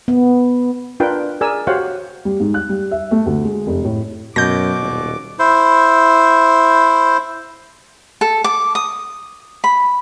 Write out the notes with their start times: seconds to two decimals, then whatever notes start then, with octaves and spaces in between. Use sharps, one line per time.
0.08 B3
1.00 D4 F4 A#4 B4 G5
1.41 G#4 A#4 D5 G#5 E6
1.67 F#4 G4 C5 C#5 F5 F#5
2.25 G3
2.40 G#2
2.54 F#6
2.69 G3
2.91 E5
3.11 A3
3.26 D2
3.45 G#3
3.67 F1
3.85 A2
4.36 F#2 B2 D6 G6 A#6
4.80 D#1
5.39 E4 C5
8.21 A4
8.44 D6
8.75 D#6
9.64 B5